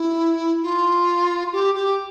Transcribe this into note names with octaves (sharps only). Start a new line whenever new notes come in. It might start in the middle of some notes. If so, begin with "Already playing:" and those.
Already playing: E4
F4
G4
G4